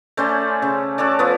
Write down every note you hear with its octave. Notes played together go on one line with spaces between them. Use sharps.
A3 C#4 C5 D5
C#3
F#4 A4 C#5 D5
F3 B3